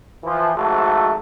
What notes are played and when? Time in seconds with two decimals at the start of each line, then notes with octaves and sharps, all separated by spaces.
0.24 E3 F3
0.55 G#1 G#2 F3 A3 F#4 A4